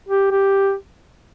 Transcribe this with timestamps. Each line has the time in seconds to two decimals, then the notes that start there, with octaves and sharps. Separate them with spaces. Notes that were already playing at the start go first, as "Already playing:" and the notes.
0.09 G4
0.31 G4